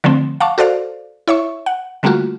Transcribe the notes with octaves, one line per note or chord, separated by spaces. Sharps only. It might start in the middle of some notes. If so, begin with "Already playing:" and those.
D3 F3 A3 C4
F5 F#5 A5 C#6 D6
F#4 A4 C5 D5 F5
E4 C#5 E5 C#6
F#5
D3 G3 A3 A#3 F4 F#4